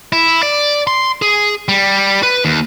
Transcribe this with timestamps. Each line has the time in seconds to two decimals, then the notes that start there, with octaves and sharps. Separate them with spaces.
0.12 E4
0.43 D5
0.87 C6
1.22 G#4
1.69 G3
2.23 B4
2.45 D#2